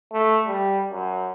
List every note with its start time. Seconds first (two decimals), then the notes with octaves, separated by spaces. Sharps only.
0.12 A3
0.47 G3
0.91 F#2